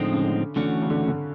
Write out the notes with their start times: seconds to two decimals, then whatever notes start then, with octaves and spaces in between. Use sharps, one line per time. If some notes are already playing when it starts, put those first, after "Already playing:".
Already playing: A2 D3 F3 G#3 C4 D#4
0.12 C#3
0.22 D3
0.56 D3 E3 A3 C#4 F#4
0.82 C#3
0.90 D3
1.08 D3